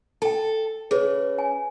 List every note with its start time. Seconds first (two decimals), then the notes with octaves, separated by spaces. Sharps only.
0.22 A4 G5 A5
0.91 C#3 G#4 B4
1.38 G#5